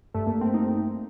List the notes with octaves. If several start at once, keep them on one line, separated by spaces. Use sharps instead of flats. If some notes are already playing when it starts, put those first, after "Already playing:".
G2 A3
A#3
G2
C4
D#4